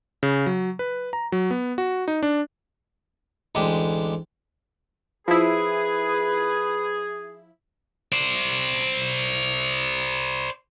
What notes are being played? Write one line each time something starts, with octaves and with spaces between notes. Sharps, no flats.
C#3
F#3
B4
A#5
F#3
B3
F#4
D#4
D4
A1 D2 G#3 D4 G4
F3 E4 G#4 B4
C5 D5